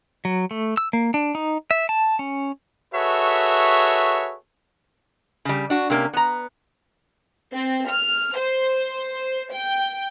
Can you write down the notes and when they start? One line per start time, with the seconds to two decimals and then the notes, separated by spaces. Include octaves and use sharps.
0.25 F#3
0.51 A3
0.77 E6
0.93 A#3
1.14 D4
1.35 D#4
1.71 E5
1.89 A5
2.19 C#4
2.94 F#4 G#4 A4 B4 C#5 E5
5.45 C#3 G3
5.70 D4 F#4
5.90 C3 A#3 C#4
6.13 B3 A#5
7.53 C4
7.89 F6
8.36 C5
9.53 G5